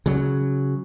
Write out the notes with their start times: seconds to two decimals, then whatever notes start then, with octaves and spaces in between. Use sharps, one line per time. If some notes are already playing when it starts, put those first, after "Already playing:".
0.06 C#3 F#3